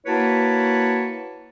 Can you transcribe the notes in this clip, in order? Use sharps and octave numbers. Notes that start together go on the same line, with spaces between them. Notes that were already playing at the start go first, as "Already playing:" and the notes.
A#3 E4 F#4 B4 C#5 A5